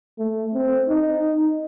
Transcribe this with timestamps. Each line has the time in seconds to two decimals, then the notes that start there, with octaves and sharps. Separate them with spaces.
0.18 A3
0.54 C4
0.89 D#4